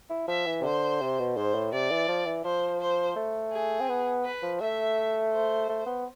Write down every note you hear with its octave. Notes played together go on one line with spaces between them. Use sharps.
E4
F3 E5
E3
C3
D3 C5
C3
B2
G#2 C5
A2
C3 D5
E3
F3
E3
F3 C5
C5
A3
G#4
C4
B3
B4
F3
A3 E5
C5
A3
B3